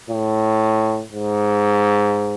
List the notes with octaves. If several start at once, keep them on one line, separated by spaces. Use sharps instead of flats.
A2
G#2